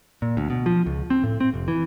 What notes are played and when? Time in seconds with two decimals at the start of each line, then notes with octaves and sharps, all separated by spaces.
0.22 A#2
0.37 D2
0.50 B2
0.66 F3
0.86 C#2
1.10 C4
1.24 A2
1.40 C4
1.54 F1
1.68 E3